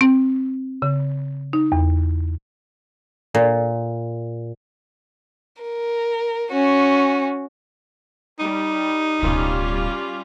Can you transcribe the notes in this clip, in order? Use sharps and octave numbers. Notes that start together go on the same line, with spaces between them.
C4
C#3
D#4
E2
A#2
A#4
C#4 F#4
G3 D#4
D1 B2 G3 C#4 F4